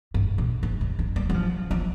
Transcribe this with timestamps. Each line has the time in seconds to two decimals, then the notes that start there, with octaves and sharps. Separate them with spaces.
0.14 G2
0.38 A#2
0.63 G#2
0.81 G3
0.99 G#3
1.16 G3
1.30 G3
1.34 F3
1.71 F3